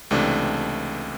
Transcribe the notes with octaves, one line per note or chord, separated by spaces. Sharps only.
C#2 C3 E3 A3 D4